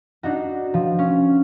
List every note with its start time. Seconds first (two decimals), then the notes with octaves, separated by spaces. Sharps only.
0.23 D4 D#4 F#4
0.74 F3
0.99 C#4